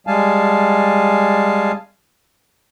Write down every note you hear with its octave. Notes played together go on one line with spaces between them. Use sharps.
G3 G#3 F5 G#5 A5